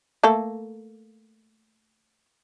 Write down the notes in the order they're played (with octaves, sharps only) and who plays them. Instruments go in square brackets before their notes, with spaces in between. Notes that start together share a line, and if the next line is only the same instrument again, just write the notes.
[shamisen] A3 A#3 A4